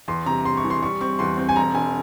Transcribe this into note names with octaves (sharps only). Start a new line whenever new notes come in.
E2 C6
C3 A#5
C3 C6
C#6
E3
C6
G3 C#6
C4 C#6
E2 C6
C4
G#5
E1 A#5
E1 G#5